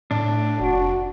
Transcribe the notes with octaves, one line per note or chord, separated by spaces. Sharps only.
A2 D4
F1 F#4